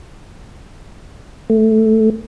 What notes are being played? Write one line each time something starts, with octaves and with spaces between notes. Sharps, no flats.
A3